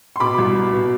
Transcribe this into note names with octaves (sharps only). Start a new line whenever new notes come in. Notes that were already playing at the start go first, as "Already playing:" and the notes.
C6
B2 B5 D6
C2
B2
B2